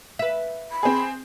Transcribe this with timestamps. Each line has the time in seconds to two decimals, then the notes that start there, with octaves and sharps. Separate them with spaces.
0.19 B4 E5
0.71 B5
0.83 C4 G#4